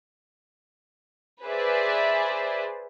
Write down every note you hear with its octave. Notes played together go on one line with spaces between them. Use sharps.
G#4 B4 C5 D5 E5